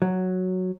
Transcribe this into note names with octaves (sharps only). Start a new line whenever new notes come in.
F#3